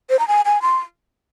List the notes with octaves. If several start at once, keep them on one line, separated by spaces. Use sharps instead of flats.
C5
A#5
G#5
G#5
C6